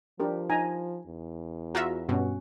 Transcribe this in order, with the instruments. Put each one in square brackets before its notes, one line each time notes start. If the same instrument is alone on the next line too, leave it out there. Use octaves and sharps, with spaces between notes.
[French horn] F3 [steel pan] D4 G4 A#4
[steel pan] D#4 G#5 A#5
[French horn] E2
[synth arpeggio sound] F4 F#4 E5 [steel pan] A#5
[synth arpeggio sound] G2 B2 [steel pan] C#4 F#4